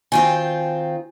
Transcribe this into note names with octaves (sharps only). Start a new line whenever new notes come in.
D#3 C4 F4 F#4 C#5 G#5